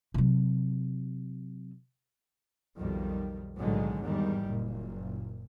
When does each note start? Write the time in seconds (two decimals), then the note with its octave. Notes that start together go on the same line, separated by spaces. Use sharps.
0.14 C3 F#3
2.76 B1 F2 D#3 G3
3.57 B1 A2 D3 D#3 F#3 G#3
4.03 E2 G#2 D#3 G3
4.47 F#1 A#2